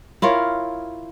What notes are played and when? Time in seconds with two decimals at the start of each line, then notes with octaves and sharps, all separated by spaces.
0.22 E4 F4 A#4 C#5